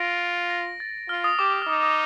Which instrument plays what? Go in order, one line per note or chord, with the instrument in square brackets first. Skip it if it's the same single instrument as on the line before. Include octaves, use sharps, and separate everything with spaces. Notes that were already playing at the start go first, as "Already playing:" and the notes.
Already playing: [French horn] F4 [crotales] A#6 D7
[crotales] A#6
A6
[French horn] F4 [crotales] F6
[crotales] D#6
[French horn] G4 [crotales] D6
[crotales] D#6
F6
[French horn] D#4 [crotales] D#6
[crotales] D#6